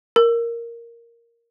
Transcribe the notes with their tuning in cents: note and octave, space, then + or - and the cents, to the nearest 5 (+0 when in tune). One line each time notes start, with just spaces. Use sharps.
A#4 +0